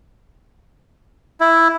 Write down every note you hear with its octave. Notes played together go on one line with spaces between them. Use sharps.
E4